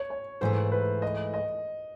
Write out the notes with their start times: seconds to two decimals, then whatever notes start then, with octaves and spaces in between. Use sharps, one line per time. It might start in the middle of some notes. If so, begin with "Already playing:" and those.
Already playing: C#5
0.10 C#5
0.41 G#2 E3 A3 C5
0.72 B4
1.02 D#5
1.34 D#5